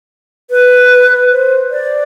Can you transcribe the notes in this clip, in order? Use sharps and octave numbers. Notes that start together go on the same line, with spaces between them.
B4
C5
D5